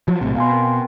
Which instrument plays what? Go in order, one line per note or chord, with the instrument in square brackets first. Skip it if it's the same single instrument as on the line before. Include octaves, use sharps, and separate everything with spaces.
[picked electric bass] F3 F#3
B1 A2 C3
[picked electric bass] B2 [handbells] F5 G#5 C6
[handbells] C4 A#4
G5